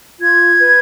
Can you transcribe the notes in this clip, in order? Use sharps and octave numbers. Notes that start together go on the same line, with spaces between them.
F4 G#6
B4